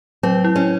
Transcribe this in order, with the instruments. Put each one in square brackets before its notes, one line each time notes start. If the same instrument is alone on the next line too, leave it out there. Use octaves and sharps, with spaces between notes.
[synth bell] F#3 [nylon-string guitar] C4
[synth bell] E4
[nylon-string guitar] C#4